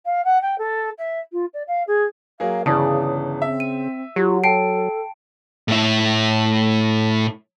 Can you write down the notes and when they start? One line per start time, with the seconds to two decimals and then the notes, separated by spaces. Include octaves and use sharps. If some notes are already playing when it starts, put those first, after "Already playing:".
0.05 F5
0.24 F#5
0.42 G5
0.58 A4
0.98 E5
1.32 F4
1.53 D5
1.67 F5
1.87 G#4
2.40 F#3 A#3 G#4 F5
2.66 G1 C#3 E3 G#4 D5 A5 D#6
3.42 C4 E5
3.60 D#7
4.16 F#3 F4 G4
4.44 A4 G5 A5 C7 D7
5.68 A2 E4